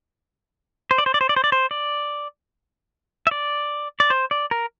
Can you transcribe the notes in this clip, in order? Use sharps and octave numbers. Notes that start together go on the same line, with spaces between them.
C5
D5
C5
D5
C5
D5
C5
D5
C5
D5
E5
D5
D5
C5
D5
A#4